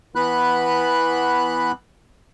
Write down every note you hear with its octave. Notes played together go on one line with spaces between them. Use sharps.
E3 B3 B5 F#6